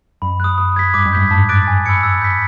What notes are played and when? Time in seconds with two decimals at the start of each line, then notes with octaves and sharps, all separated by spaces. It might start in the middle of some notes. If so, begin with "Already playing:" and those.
0.22 F#2 B5
0.40 D#6 F#6
0.58 D#6
0.76 G#6 B6
0.94 G2 D6
1.06 F#2
1.13 G2 G6 B6
1.31 G#2 A5
1.49 D6 F#6 A6 D7
1.67 G#5
1.86 B5 E6 G#6 C#7
2.03 E6
2.22 G6 B6